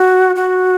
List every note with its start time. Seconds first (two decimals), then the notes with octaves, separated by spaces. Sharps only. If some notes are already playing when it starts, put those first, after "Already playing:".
Already playing: F#4
0.36 F#4